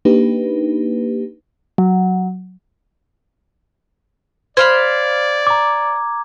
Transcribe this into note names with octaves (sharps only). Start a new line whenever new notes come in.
A#3 D4 D#4 G4 B4
F#3
C5 D5 F5 B5 G#6
A#5 D6